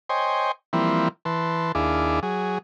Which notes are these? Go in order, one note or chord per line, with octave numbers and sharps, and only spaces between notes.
C5 C#5 D#5 G5 G#5 C6
E3 F3 G3 A#3 C4 E4
E3 B4 A5 C6
D#2 D4 E4 G#4 F5 D6
F#3 G#4